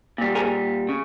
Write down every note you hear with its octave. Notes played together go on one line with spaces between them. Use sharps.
A#2 G3
G#4 A#4
C#3